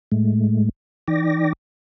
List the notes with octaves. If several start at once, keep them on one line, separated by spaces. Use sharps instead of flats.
A2 G#3 A3
E3 D#4 D5 G5 D6 A#6